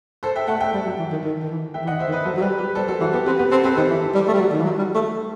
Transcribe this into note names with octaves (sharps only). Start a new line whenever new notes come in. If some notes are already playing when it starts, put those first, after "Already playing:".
A4 C5
E5 G5
A3 F#5 A5
E5 G5
G3
F#3
E3
D#3
D#3
D#3
E3
E5 G5
E3
D#5 F#5
D#3
C5 E5
D#3
B4 D#5
F#3 A4 C5
F#3
G3 G4 B4
G4 B4
G3 A4 C5
F#3 A4 C5
E3 F#4
B3 G4
C4 G4 B4
B3 G4 B4
C4 A4 C5
C4 G4 B4
D#3 A4 C5
E3
G3
A3
G3
F#3
D#3
E3
F#3
G3
A3